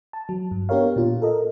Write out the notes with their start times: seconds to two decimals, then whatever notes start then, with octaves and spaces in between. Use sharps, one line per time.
0.13 A5
0.29 F#3
0.51 G2
0.69 B3 D4 G4 A#4 C#5 F5
0.96 A#2 F4
1.22 A4 A#4 D#5